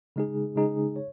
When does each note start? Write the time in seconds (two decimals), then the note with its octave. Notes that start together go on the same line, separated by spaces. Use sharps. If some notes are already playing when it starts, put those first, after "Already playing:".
0.16 C#3 G#3 D#4 G#4
0.56 C#3 G#3 D#4 G#4
0.96 C#5